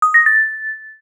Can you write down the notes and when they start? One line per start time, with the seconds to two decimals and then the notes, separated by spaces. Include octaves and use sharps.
0.02 D#6
0.14 A#6
0.26 A6